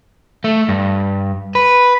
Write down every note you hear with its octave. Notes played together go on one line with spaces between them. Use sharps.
A3
G2
B4